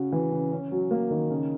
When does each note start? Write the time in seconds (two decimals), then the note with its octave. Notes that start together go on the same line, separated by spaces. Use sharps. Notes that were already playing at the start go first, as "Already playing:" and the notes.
Already playing: C#3 F#4
0.12 E3
0.32 C#3
0.52 C#4
0.71 F#3
0.91 A#3
1.11 D#3
1.30 C#3